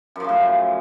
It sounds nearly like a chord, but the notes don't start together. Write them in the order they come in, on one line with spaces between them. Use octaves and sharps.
F#2 F3 C#3 A2